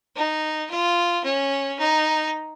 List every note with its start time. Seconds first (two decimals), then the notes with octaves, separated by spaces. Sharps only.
0.16 D#4
0.70 F4
1.24 C#4
1.79 D#4